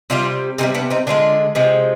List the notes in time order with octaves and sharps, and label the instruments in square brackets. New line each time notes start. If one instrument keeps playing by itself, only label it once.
[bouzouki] C3 G3 D4 F4
C3 D#3 G3 C4 D#4
B3 D4
C4 D#4
D3 F3 G#3 D4 F4
C3 F3 G#3